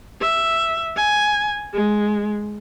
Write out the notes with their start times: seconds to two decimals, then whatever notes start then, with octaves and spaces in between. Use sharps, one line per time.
0.21 E5
0.96 G#5
1.74 G#3